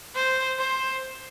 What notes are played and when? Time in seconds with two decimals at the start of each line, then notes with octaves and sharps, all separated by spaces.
0.15 C5
0.59 C5